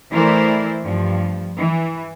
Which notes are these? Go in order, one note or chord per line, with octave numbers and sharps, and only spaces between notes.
E3 A3 E4 A#4 C5 D5
G2 F3
E3